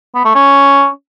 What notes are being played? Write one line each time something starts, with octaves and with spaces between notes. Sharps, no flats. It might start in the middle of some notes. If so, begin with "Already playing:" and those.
B3
A3
C#4